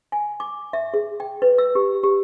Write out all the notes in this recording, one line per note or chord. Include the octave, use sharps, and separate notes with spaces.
G#5
D6
E5
G#4
G5
B4
E6
G4
G4